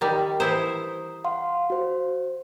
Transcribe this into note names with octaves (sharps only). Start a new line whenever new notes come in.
D#3 G3
E3 E4 C5 A#5 D#6
F5 F#5 C6
F#4 C5